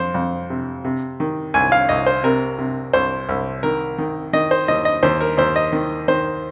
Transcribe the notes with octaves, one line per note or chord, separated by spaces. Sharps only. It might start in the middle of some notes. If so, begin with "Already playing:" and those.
Already playing: F2 C5
F2
C3
C3
D#3
C2 G#5
F5
C2 D#5
C5
C3 A#4
C3
C2 C5
C2
D#3 A#4
D#3
D#3 D#5
C5
D#2 D#5
D#5
D#2 C5
A#4
D#2 C5
D#5
D#3
D#3 C5